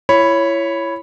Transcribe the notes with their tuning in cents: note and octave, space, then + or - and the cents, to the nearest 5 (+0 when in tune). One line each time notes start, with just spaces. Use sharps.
E4 +30 C#5 +0 B5 +0